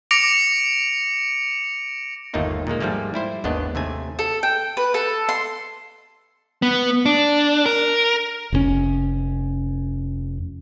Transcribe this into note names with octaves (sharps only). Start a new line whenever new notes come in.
D6 A#6 C#7 D7 F7
G1 D#2 A3 A#3 D#4 F4
A#2 D#3 G#3 A#3
G#2 F3 G3 A3 A#3
G3 E4 C5
G#1 D#2 B3 D4 D#5
D#2 C3 A3 G#5
A4
G5
B4
A4
C6
B3
D4
A#4
F1 B2 C#4